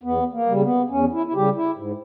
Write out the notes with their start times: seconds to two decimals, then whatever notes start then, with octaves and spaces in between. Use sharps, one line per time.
0.04 E2 B3
0.33 A#3
0.46 C#3 G3
0.62 B3
0.90 E2 C#4
1.13 E4
1.26 E4
1.34 C#3 G3 G4
1.56 E4
1.77 G#2